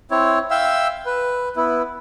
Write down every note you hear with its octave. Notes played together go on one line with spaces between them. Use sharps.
C4 E4 C#5
E5 F5 G5 E6
B4
B3 E4